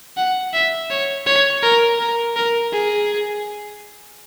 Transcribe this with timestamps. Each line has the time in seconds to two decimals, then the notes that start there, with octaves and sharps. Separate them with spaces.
0.17 F#5
0.53 E5
0.90 C#5
1.26 C#5
1.63 A#4
1.99 A#4
2.36 A#4
2.72 G#4